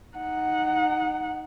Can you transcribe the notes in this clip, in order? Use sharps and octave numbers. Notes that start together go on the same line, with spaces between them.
D#4 F#5